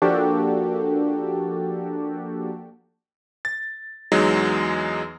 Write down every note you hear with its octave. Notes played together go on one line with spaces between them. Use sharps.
F3 A#3 D4 F#4 G4 A4
A6
E2 F#3 G#3 D#4